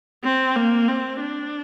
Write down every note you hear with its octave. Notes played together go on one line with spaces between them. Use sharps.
C4
A#3
C4
D4